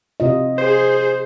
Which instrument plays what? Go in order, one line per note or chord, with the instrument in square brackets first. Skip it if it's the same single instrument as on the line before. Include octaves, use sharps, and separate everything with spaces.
[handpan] C3 F4 D#5
[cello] G#4 [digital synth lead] C5